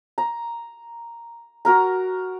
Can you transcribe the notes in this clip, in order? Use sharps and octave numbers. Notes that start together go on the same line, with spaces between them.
A#5
F#4 A#4 A#5